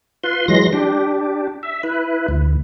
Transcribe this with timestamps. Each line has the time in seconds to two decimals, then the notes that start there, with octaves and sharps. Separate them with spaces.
0.24 F4 B4 C6
0.48 E3 F#3 G#3 C6 A#6
0.73 D4 G4
1.63 E5
1.83 E4 B4
2.28 D2